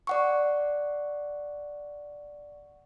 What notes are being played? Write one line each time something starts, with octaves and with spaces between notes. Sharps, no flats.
D5 F#5 C#6